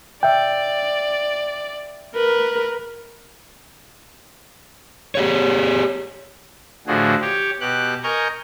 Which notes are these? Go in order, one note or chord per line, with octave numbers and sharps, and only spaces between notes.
D5 E5 G5
A#4 B4
G4 G#4 C#5
A2 D3 F3 F#4 G#4
G4 C#5
B2 G4 F#6
A#4 D#5 G#5 A#5 C#6 G6